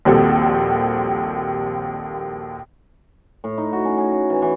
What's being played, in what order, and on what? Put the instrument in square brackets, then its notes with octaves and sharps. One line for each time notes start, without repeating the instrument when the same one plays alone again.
[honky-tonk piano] A#1 D#2 G3 C4 F#4 A4
[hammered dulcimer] A2
D#4
F#4
C#4
G#4
C#4
E3
E3